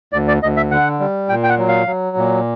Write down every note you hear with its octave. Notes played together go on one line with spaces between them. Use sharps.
D2 D5
D5
D2 D#5
E5
D3 F#5
G3
A#2 G5
G5
F#5
F#3
F5
F#3
A#2